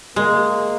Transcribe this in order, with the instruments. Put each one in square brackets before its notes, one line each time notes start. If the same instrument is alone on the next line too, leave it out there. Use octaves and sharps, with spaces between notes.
[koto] G#3 [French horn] A#3